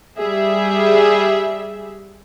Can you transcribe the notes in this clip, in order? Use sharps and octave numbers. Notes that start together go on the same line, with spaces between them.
G3 G#4 E5